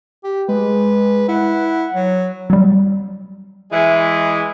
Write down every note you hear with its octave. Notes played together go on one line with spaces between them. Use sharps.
G4
G#3 B4
E4 F#5
F#3
F#3 G3
E3 G#3